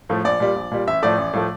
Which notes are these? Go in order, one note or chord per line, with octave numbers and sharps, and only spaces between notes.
A2 F3 A3
A#1 D5
A#2 G3
A#1
A#2 G3
A1 E5
A2 F3 A3 D5
A1
A2 F3 A3